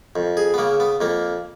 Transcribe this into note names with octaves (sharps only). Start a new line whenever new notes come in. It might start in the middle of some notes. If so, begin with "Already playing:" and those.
F2
G#4
B3
C#3 A#3
B3
F2 A#3